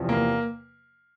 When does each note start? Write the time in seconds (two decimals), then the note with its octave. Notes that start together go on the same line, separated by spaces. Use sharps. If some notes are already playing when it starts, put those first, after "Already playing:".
Already playing: E2 C3 F3
0.09 A#3